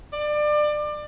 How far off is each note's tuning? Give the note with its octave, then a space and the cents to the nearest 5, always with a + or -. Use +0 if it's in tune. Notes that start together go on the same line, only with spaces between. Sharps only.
D5 +25